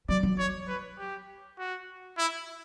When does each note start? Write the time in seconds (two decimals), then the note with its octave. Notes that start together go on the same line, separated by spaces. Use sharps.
0.09 F#3 D5
0.23 F#3
0.38 C#5
0.68 B4
0.99 G4
1.59 F#4
2.18 E4